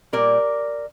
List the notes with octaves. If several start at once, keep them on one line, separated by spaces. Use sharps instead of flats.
A#2 G3 A#3 A#4 D5